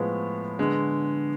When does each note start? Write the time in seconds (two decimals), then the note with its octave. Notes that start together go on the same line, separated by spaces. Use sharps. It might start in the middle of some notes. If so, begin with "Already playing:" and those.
Already playing: A2 F3 G#3 B3
0.59 D3 G#3 B3